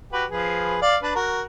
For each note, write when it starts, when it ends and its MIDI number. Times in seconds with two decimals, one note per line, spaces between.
0.13 0.25 66
0.13 0.25 67
0.13 0.25 71
0.30 0.78 53
0.30 0.78 68
0.30 0.78 71
0.82 0.97 74
0.82 0.97 77
1.02 1.14 62
1.02 1.14 71
1.15 1.42 66
1.15 1.42 70